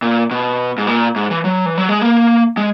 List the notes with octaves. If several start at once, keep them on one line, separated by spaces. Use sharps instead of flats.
A#2
B2
G#2
A#2
G#2
E3
F#3
E3
F#3
G#3
A#3
G#3